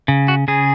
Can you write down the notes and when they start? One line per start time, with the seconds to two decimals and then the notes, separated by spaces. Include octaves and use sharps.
0.08 C#3
0.28 F#4
0.48 C#3 G#4